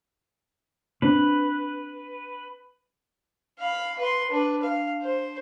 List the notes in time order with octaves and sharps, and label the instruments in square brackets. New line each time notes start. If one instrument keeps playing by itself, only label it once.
[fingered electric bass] C4 D4 [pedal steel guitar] B4
[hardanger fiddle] F5 B5
B4 C6
D4 B4
F5
C5